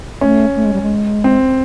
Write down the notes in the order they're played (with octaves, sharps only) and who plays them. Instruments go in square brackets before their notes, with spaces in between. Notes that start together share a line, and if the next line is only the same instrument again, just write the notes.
[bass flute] A3 [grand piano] C#4
[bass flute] A3
G#3
G3
G#3
[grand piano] C4